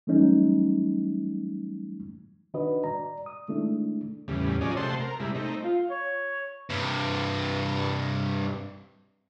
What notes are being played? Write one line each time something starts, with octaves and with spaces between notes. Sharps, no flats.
E3 F#3 G3 A3 C#4 D#4
D#3 D4 F#4 B4 D5 D#5
D5 A#5
D#6
D#3 G#3 A3 D4 E4
E2 A2 C#3 G3
F3 F#3 C#4 G#4 D5 D#5
C3 A3 C5 F#5 A5 C6
A#4
C3 G3 G#3 E4
A3 C4 D#4
F4
C#5
G2 C3